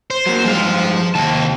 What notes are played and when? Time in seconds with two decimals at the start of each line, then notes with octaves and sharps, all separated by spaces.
0.11 C5
0.26 F#3 A#3
0.46 G2 F3 G#3 F5
1.15 D#2 C3 A5